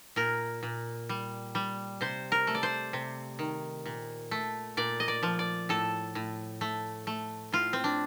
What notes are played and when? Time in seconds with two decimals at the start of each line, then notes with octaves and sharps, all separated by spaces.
0.16 A#2 A#4
0.63 A#2
1.09 G3
1.55 G3
2.01 C3 C5
2.32 A#4
2.47 A3
2.55 D5
2.63 C5
2.93 C3
3.39 D#3
3.86 A#2
4.31 A3
4.77 A#2 D5
5.00 D#5
5.08 D5
5.23 F3
5.39 D5
5.69 A2 A4
6.15 A2
6.61 A3
7.07 A3
7.52 A2 F4
7.73 C4
7.84 D4